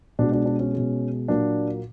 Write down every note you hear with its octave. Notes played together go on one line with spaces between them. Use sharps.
B2 D4
G#3
D4
D4
C#4
B2 G#3
A#2 F#3 A#3 D4